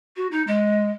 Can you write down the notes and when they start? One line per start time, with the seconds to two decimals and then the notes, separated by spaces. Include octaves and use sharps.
0.16 F#4
0.31 D#4
0.47 G#3